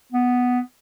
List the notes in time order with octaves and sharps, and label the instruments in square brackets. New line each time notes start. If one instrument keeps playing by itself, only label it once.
[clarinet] B3